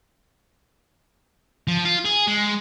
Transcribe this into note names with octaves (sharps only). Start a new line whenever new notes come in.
F3
F4
G#4
G#3